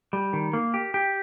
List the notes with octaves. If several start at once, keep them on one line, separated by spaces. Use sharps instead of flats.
G3
D#3
A#3
G4
G4